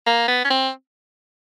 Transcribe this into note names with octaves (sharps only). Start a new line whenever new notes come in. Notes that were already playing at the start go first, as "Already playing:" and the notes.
A#3
B3
C#4
C4